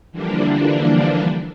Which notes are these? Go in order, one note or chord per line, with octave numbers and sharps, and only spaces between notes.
D3 E3 F3 G3 A#3 D4